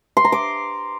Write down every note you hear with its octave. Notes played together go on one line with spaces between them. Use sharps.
C6
A#5
D6